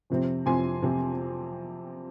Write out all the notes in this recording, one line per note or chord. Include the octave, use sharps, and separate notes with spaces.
F2 C3 F3 C4
F2 C3 F3 C4 G#5 C6
F2 C3 F3 C4